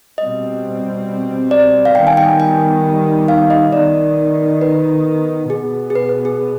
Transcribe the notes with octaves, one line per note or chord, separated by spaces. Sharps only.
B2 G3 C4 D#5
D5
F5
D#3 G3 B3 G5
G#5
G5
G5
F5
D#5
D#3 B3 D5
B4
B2 B3 G#4
G#4
B4
B4
G#4